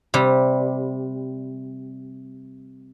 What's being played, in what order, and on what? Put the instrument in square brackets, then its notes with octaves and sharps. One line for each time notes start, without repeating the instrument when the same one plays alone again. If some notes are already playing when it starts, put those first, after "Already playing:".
[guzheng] C3 G3